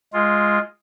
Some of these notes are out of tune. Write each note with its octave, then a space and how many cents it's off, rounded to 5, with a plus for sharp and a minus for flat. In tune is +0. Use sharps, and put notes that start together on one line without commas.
G#3 +0 F4 +0